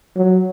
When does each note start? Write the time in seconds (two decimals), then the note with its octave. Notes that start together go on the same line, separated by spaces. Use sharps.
0.16 F#3